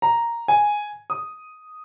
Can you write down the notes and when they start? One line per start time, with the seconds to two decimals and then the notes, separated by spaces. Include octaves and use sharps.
0.02 A#5
0.48 G#5
1.10 D#6